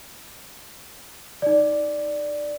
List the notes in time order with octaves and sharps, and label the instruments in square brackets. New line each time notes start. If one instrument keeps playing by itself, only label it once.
[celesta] D#4 D5